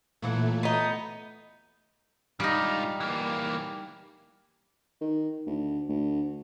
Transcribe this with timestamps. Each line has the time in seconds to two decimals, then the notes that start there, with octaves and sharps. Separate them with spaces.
0.22 A#2 E3 F#3 A3
0.63 B3 D#4
2.40 G#2 G3 D#4 F4
3.00 E3 A#3
5.01 D#3
5.47 D2
5.89 D2